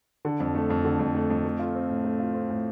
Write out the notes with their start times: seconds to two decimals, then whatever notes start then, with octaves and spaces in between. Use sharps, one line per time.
0.25 D3
0.40 F2
0.55 A3
0.70 F2
0.85 D3
0.99 F2
1.15 A3
1.30 F2
1.45 A3
1.59 F4
1.75 C4
1.89 A2
2.04 A3
2.20 F4
2.35 C4
2.50 A2